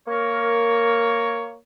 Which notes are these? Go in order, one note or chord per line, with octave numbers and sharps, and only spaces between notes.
A#3 A#4 C#5